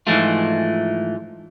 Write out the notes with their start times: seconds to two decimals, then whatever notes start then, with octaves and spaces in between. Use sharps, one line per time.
0.07 G#2 E3 F3 G#3 A3 F4